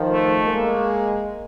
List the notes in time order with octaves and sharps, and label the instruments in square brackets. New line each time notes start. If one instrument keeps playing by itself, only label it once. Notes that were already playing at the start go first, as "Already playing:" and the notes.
Already playing: [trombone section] D#3 F3
[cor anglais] A3
[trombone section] G#3 A#3